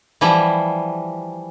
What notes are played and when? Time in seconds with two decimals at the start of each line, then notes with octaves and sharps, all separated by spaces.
0.21 E3 F3 G3 E4